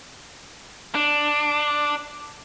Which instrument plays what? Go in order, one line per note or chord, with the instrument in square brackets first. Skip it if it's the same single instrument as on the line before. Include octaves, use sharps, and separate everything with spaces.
[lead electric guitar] D4